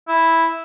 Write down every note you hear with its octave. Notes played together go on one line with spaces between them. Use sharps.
E4